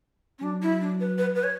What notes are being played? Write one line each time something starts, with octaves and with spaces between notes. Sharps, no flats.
C#4
F#3 D4
E4
D4
B4
B4
B4
C#5